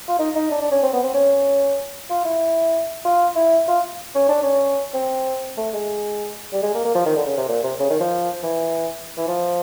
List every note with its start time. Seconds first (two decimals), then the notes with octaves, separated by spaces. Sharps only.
0.08 F4
0.19 D#4
0.35 D#4
0.51 D4
0.61 D4
0.71 C#4
0.83 C4
0.93 B3
1.03 C4
1.14 C#4
2.10 F4
2.25 E4
3.05 F4
3.35 E4
3.68 F4
4.15 C#4
4.28 D4
4.43 C#4
4.94 C4
5.57 A3
5.73 G#3
6.52 G3
6.63 G#3
6.74 A#3
6.85 A#3
6.95 F3
7.05 D#3
7.16 D3
7.26 C#3
7.37 C3
7.48 A#2
7.63 C3
7.79 C#3
7.90 D#3
8.00 F3
8.43 E3
9.17 E3
9.28 F3